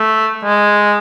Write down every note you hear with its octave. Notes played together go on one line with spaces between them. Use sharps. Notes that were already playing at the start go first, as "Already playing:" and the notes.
Already playing: A3
G#3